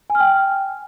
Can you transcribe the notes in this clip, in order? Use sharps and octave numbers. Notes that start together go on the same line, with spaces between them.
G#5
F6
G5